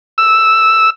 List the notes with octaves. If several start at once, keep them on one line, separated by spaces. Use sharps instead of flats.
E6